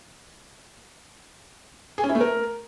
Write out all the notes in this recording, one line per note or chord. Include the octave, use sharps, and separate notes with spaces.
G#4
C#4
E4
A3
A#4